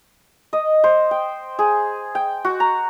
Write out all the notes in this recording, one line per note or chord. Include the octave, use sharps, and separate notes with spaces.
D#5
C5
G5
G#4
G5
F#4
A#5